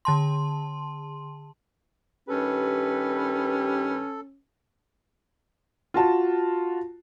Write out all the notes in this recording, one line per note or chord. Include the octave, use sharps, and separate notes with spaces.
D3 A5 C6
G2 D#3 C#4 G4 A4 B4
F4 F#4 A5